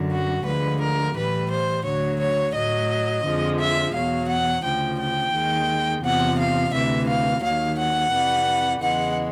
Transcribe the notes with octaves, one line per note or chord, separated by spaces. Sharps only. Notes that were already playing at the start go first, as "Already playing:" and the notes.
Already playing: F#2 D3 F#3
F#4
D2 D3 F3 G#3 B4
A#4
A2 E3 G3 B4
C5
D2 D3 F#3 C#5
C#5
A2 F#3 D#5
F2 D3 F3 G#3
E5
E2 B2 F#3 F5
F#5
D2 C#3 F3 G5
G5
D#2 D#3 G#3
E2 C3 F3 F#5
F5
D2 C3 E3 E5
F5
D#2 D#3 F#3 F5
F#5
F2 C3 E3 G3
E2 C#3 E3 G#3 F#5